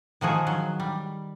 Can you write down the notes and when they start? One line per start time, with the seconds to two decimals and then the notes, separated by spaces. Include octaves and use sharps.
0.21 D#3 F3 F#4 G#4
0.47 F#3
0.80 G3